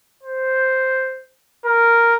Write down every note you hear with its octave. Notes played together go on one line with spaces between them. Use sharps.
C5
A#4